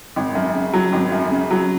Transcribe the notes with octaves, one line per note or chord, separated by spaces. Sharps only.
G#1
F#2
C#3
F#3
G#1
F#2
C#3
F#3